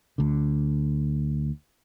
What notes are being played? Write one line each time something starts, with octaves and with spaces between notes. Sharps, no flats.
D2 D3